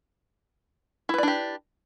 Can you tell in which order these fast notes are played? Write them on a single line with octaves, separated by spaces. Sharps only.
E4 B4 D5 D4 G4